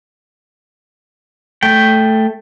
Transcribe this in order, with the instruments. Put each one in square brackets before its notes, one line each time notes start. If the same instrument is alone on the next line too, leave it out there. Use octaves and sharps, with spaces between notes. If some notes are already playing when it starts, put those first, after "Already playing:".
[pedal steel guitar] A3 G5